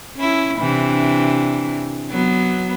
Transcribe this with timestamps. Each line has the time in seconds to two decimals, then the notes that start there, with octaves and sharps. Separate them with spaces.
0.16 C#4 E4
0.59 C3 E3 D4
2.09 F#3 B3